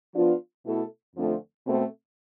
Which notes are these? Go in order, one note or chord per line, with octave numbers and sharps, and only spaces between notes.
F3 B3 D4 F4
B2 A3 E4 A4
F2 D3 F3 A3 C4
B2 A3 C4